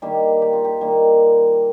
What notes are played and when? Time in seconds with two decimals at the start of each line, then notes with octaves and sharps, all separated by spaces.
0.02 D#3 G3 A#3 G4
0.42 G4
0.53 F4
0.65 G4
0.81 D#3 G3 A#3